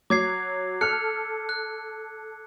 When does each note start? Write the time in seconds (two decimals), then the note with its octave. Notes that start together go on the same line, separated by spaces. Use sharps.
0.10 F#3 D6 G#6 C7
0.81 A4 F6 F#6 C#7
1.49 F#6